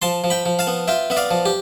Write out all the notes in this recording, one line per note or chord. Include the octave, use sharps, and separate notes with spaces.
F3 A5 C6
F3
G5 B5
F3
F5 A5
B3
F4 E5 G5
B3 E5
D5 F5
F3
G4